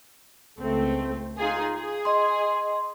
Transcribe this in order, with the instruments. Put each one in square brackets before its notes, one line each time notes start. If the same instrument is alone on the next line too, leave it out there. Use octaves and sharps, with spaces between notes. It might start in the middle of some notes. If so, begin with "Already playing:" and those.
[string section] C#2 A3 C4
D#4 F4 G#4
G#4
[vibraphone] D#5 C6